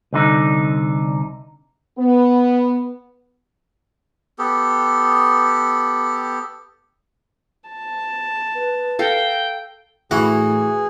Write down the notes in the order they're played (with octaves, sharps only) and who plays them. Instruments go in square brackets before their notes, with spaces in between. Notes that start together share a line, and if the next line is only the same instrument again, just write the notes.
[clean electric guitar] C2 D3 D#4
[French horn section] B3
[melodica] B3 G4 A4
[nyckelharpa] A5
[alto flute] B4
[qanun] A4 F5 A#5 [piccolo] G5
[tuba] A2 [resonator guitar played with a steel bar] E3 [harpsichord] F#4 [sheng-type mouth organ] G#4